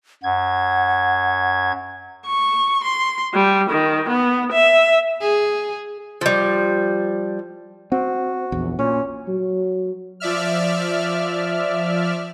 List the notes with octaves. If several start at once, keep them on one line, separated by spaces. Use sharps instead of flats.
F#2 F#5 G#6
C#6
C6
G3
D#3
B3
E5
G#4
F3 G3
C4 F#4
A#1 E2
A#2 C#4
F#3
F3 D5 E5 F6